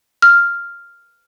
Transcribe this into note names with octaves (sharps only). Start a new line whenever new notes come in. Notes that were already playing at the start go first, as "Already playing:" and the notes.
F6